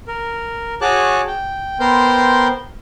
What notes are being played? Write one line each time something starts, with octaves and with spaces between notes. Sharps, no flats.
A#4
F#4 G#4 C#5 A5 D6 F#6
G5
B3 A#4 C5 G5 C6 G6